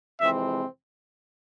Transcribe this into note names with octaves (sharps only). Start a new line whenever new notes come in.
F2 C3 E3 G#3 C4 E5